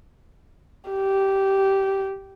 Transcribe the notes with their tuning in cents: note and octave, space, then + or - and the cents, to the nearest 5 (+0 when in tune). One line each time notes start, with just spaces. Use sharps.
G4 -15